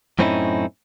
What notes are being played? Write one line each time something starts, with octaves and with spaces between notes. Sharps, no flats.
F#2 A2 C4 C#4 D#4 E4